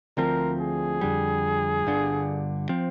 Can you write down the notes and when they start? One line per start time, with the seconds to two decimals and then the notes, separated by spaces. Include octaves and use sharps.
0.17 D2 D3 F3 C4 A#4
0.60 G#4
1.01 F2 D3 G3
1.85 G1 G2 D3
2.69 F3 C4